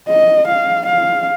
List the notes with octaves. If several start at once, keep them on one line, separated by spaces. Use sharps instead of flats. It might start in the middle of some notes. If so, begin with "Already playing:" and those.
D#5
F5
F5